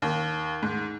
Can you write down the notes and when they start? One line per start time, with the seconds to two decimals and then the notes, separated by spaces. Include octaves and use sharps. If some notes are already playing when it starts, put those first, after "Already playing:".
0.02 D#2
0.62 G#2